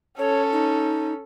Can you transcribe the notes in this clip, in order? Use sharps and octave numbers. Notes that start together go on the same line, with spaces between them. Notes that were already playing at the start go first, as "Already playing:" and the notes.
C#4 A4 C#5
D#4